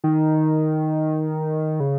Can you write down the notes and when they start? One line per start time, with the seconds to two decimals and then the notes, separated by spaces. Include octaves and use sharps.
0.04 D#3
1.80 C#3